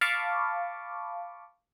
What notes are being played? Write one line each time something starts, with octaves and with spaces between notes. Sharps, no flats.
F5 A5 B5 C#6 D6